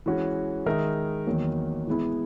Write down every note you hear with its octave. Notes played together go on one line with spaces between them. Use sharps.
E3 G#3 C#4 F#4
D#3 G#3 D#4 A#4 E5
E2 D#3 F#3 A#3
E3 G#3 B3 E4